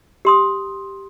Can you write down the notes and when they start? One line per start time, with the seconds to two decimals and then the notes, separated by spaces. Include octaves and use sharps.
0.25 G4 C6 D#6